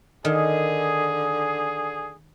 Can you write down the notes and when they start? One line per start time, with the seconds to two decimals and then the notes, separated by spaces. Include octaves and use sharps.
0.25 D3 D#3 G#4